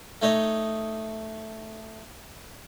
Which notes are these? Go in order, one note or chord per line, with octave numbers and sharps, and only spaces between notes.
A3 D#4 C#5 D#5